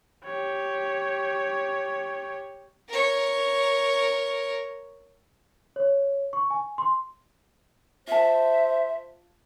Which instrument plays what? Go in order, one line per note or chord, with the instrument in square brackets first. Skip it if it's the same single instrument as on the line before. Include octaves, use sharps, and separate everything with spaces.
[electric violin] G4 C#5
[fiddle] A#4 C#5
[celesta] C#5
C#6
G#5
C6
[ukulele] F4 A5 [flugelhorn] C5 [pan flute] E5